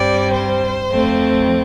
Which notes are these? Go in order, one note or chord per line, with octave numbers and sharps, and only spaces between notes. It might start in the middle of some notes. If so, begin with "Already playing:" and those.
Already playing: G2 G3 C4 D5
C5
F2 F3 A3 C4